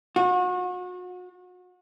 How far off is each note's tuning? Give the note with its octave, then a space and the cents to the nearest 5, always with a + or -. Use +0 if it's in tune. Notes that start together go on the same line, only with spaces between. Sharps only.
F#4 -35